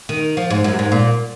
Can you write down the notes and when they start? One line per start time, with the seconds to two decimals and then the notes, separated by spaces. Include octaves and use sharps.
0.09 D#3
0.37 F3
0.50 G#2
0.64 F#2
0.79 G#2
0.92 A#2